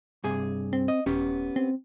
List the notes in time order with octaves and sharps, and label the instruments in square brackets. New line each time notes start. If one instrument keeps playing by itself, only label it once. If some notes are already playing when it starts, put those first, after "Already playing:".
[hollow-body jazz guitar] G2 C3 G#4
[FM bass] C4
[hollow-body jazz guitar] D#5
[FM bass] D#1 [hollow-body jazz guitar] B3 C#4 G4
[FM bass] C4